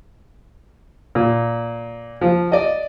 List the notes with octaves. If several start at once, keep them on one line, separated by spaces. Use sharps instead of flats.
A#2
F3
D5 D#5